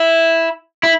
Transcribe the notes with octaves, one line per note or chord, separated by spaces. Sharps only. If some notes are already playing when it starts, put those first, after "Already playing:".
Already playing: E4
E4